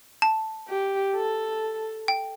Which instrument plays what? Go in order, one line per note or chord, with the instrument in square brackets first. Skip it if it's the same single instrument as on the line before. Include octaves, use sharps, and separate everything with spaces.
[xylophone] A5
[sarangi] G4
A4
[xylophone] G5